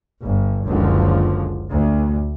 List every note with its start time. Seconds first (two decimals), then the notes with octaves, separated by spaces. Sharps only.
0.23 G1
0.67 F#1 C#2 D3 F3
1.70 D2